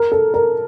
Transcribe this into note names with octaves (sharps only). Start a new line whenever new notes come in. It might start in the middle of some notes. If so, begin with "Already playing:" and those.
Already playing: A#4
A4
A#4